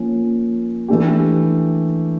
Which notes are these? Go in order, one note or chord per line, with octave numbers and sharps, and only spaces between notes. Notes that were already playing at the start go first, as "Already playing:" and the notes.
Already playing: F3 A#3 C#4
E3 A3 D4 G4